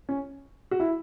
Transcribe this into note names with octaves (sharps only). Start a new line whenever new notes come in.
C#4
F#4
E4